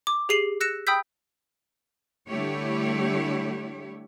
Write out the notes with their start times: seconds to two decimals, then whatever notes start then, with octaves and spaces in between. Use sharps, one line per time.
0.07 D6
0.29 G4 G#4 C7 D#7 F#7
0.60 E6 F#6 A#6 C#7 E7
0.87 G5 B5 D#6 E6 G6 B6
2.28 D3 G3 A3 E4 G4 C#5